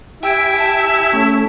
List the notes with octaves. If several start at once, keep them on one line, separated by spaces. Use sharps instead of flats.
E4 G4 E5 G5 G#5
A5
A3 C#4